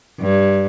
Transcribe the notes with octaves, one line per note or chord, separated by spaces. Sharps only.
G2